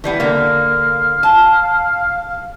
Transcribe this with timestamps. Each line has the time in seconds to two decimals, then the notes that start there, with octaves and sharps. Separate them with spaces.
0.04 E3 G3 B3
0.20 D3 A#3 F5
1.23 A5